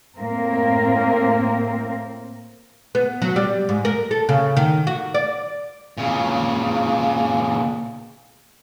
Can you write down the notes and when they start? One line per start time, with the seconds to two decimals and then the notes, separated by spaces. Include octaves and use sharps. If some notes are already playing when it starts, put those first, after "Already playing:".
0.16 A2 A#3 C4 A#4
2.95 B3
3.22 F#3
3.36 G3
3.69 G#2
3.85 A#4
4.11 A4
4.29 C#3
4.57 D#3
4.87 F#4
5.14 D5
5.98 A#2 C#3